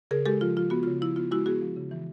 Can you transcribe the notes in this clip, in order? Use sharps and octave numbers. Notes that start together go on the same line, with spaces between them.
C#3 G#4 A#4
G#3 G4 A4
F3 F4
F3 F4
B3 F#4
C#3 F4
F3 E4
B3 F4
G#3 E4 F#4
B3 F#4 G#4
F3
C#3
E3